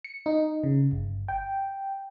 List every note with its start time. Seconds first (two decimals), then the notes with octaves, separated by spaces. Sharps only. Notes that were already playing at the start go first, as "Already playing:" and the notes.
0.05 C#7
0.26 D#4
0.63 C#3
0.91 G1
1.28 G5